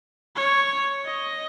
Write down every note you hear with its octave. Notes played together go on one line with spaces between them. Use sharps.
C#5
D#5